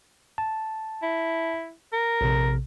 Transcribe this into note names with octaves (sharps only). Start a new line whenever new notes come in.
A5
E4
A#4
A#1 C3